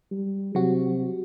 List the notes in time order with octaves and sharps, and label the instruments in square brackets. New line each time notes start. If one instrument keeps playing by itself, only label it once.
[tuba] G3
[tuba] C3 [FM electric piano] F#3 F#4